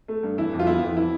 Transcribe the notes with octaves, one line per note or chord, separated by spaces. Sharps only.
A3
G2
E3 E4
F2
F4
B3 E4
F2
E3 E4